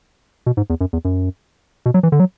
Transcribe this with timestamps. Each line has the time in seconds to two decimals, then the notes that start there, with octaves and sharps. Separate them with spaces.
0.47 B2
0.57 G#2
0.70 E2
0.81 F#2
0.93 E2
1.05 F#2
1.86 B2
1.94 F#3
2.03 E3
2.12 D3
2.20 F#3